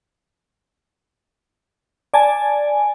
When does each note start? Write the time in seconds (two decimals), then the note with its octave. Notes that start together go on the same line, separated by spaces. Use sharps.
2.14 D5 G#5 A5